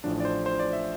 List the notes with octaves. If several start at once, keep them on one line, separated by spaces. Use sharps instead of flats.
A1 A2 F3 D4
D5
C5
C5
D5
E5